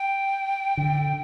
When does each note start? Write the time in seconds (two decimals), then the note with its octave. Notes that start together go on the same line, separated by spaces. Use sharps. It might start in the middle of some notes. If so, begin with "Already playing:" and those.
Already playing: G5
0.77 D3